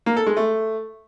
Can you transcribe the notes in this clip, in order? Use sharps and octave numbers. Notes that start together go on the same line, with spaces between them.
A#3
A4
G#3
A3